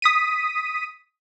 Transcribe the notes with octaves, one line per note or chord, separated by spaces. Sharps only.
D#6 B6 D#7